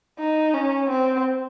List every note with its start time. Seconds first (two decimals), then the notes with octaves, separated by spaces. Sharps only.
0.20 D#4
0.54 C#4
0.89 C4